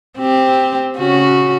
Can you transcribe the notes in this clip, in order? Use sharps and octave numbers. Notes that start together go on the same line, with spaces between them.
C4 G4
C#3 C#4 F#4